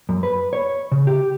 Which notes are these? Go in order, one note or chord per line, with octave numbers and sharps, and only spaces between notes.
F#2
B4
C#5
C#3
G4